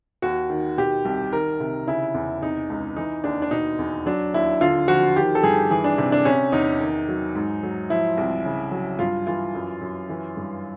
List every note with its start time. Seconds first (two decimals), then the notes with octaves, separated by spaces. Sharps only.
0.22 D#2 F#4
0.50 D#3
0.77 B2 G4
1.05 C2
1.32 D#3 A#4
1.60 C3
1.87 C#3 E4
2.14 E2
2.42 C3 D#4
2.70 C#2
2.96 E3 D#4
3.24 D#2 D4
3.42 D4
3.51 B2 D#4
3.79 E2
4.06 F#3 D4
4.34 D#2 E4
4.61 D3 F4
4.88 F3 F#4
5.16 D#3 G4
5.35 A4
5.43 G2 G#4
5.71 E3 G#4
5.84 D4
5.98 C3
6.12 D4
6.25 C3 C#4
6.52 E2 D#4
6.80 D#3
7.08 F#3
7.35 G#2
7.63 F#3
7.90 F3 E4
8.17 C2
8.45 C#3
8.71 F#3
8.99 G2 F4
9.27 E3 F4
9.55 F#2
9.81 F#2
10.09 E3
10.37 G2